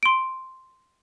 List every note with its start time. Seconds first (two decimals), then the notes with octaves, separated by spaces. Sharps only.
0.03 C6 D7